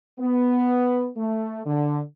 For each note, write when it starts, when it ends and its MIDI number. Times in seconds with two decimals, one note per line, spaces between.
0.20 1.09 59
1.17 1.61 57
1.66 2.00 50